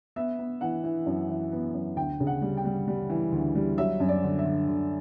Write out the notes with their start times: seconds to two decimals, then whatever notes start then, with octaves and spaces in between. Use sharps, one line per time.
0.16 B3 E5
0.39 B3
0.61 E3 F#5
0.84 E3
1.06 F#2
1.29 E3
1.52 B3
1.74 F#2
1.96 D2 G5
2.20 C#3
2.27 F#5
2.42 G3
2.57 G5
2.65 G3
2.88 G3
3.09 E3
3.32 D2
3.55 G3
3.78 F#3 E5
4.00 F#2
4.09 D5
4.24 D3
4.39 E5
4.45 D3
4.68 D3